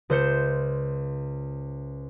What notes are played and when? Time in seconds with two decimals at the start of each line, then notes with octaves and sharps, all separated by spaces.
0.10 C#2 C5 G6 C#7 E7